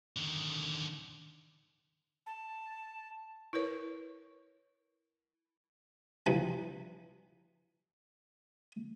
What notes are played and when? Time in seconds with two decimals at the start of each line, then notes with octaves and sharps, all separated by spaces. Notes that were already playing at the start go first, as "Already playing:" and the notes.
0.17 D3 D#3
2.26 A5
3.53 E4 A#4 B4 C#5
6.26 G2 C3 E3 F3 G3